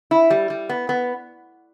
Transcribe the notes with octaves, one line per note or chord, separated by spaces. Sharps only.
E4
G3
G3
B3
B3